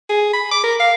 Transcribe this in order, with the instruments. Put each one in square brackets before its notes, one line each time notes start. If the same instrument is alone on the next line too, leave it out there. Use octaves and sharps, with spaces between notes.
[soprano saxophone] G#4
B5
D6
A#4
F5